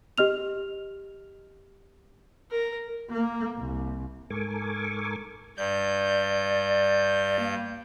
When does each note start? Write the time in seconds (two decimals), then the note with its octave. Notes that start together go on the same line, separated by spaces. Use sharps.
0.18 G4 D#5 F6 F7
2.51 A#4
3.10 A#3
3.58 C2
4.30 G#2 A4 A#4 G#5 C#6 D6
5.57 G2 D5 G6
7.39 A#3